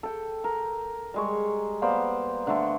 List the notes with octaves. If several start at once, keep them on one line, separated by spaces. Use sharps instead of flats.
A4 G5
A#4
G3 G#3 C#6
A#3 B3 C5 D5
D3 A3 A4